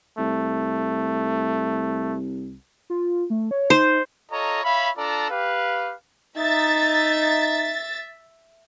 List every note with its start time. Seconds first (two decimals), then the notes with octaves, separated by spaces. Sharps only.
0.19 C2 A3
2.90 F4
3.30 A3
3.51 C#5
3.70 D#4 C5
4.31 F4 A4 C#5 D#5 A#5
4.63 C#5 E5 F5 B5
4.97 D4 F4 A4 D5 A5 A#5
5.30 G4 B4 F5
6.37 D#4 E5 A6